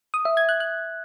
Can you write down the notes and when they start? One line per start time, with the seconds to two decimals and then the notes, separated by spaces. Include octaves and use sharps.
0.14 D#6
0.25 E5
0.37 G#6
0.49 F#6
0.60 F#6